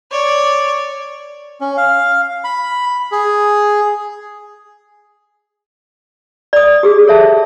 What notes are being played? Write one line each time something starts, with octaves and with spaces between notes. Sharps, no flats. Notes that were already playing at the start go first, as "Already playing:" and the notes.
C#5 D5
C#4
F5
B5
G#4
D5 D#6
G4 G#4
A4 C#5 E5 A5